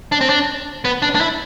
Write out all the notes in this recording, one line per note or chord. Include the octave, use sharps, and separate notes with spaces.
D4
C4
D4
B3
D4
D4
E4